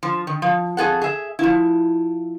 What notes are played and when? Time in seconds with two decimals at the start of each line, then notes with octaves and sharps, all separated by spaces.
0.03 F3
0.27 D#3
0.42 F3
0.77 F2 G#4 A4 F#5
1.02 G#4 E5
1.39 F3 E4